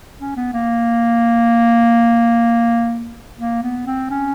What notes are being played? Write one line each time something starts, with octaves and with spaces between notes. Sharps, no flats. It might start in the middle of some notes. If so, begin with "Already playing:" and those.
C#4
B3
A#3
A#3
B3
C4
C#4